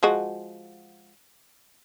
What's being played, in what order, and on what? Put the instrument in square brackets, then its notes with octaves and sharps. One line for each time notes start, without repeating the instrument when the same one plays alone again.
[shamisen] F3 G#3 F#4